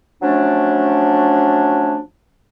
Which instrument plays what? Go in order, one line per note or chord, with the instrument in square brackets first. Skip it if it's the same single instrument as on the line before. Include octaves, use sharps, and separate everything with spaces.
[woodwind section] F3 F#3 A3 C#4 D4